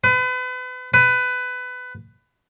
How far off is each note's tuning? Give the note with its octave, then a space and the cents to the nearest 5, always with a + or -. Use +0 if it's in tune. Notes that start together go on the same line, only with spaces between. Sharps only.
B4 +35
B4 +20